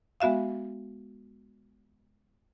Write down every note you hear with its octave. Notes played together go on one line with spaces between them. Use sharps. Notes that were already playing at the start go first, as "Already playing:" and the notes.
G#3 B3 F#4 E5 F5